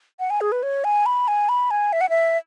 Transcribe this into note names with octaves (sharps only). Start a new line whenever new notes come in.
F#5
G#5
G#4
B4
C#5
G#5
B5
G#5
B5
G#5
E5
F#5
E5